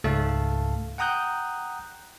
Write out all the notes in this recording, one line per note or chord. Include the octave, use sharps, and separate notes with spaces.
C#2 G#2 A3 A4 F5 A5
F#5 G5 A#5 D#6 F#6 G6